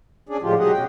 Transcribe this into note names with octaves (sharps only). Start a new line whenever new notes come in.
C#4 D4 G#4 D5
A2 D3 F3 G#3 F4 G4
B2 F#3 G4 G#4 D#5 F#5
B2 C#4 G5